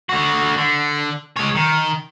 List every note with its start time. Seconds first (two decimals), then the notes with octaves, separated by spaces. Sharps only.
0.09 D3 F#4
0.57 D3
1.36 G#3 C#5
1.55 D#3